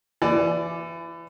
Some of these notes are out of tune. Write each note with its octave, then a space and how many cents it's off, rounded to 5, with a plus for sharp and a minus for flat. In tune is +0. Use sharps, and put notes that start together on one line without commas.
E3 +25 D5 +0